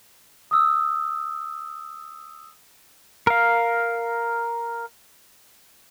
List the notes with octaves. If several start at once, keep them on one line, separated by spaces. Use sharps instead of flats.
D#6 E6
A#4 F5